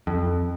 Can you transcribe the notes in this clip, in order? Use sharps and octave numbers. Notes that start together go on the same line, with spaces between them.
F2